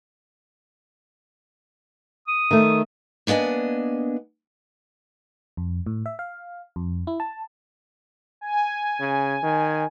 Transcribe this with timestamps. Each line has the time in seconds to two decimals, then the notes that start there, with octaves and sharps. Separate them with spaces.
2.28 D#6
2.51 D#3 A3
3.27 A#3 B3 D4 D#5 G#5
5.57 F2
5.86 A2
6.06 E5
6.19 F5
6.76 F2
7.07 E4
7.20 A5
8.41 G#5
9.00 C#3
9.43 D#3